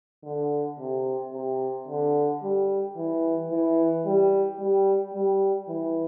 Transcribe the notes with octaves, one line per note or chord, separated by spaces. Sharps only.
D3
C3
C3
D3
G3
E3
E3
G3
G3
G3
E3